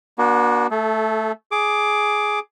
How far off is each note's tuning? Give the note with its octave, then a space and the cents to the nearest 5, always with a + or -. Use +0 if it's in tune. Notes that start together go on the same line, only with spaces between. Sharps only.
A#3 +45 D4 +0 F#4 +0
A3 +0 A4 -30
G#4 +10 D6 +5